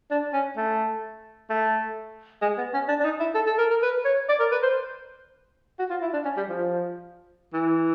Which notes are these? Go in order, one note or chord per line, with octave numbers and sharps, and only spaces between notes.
D4
C#4
A3
A3
G#3
B3
C#4
D4
D4
D#4
E4
A4
A4
A#4
A#4
B4
C#5
D5
A#4
B4
C5
F#4
F4
E4
D4
C#4
G3
F3
E3